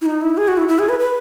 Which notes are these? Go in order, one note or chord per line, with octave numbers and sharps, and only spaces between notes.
E4
D#4
E4
G#4
F#4
E4
E4
G#4
B4
B4